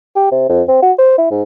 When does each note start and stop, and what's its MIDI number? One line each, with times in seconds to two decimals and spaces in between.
0.16 0.31 67
0.32 0.45 48
0.49 0.62 41
0.69 0.79 60
0.82 0.92 66
0.98 1.17 72
1.18 1.27 64
1.31 1.43 44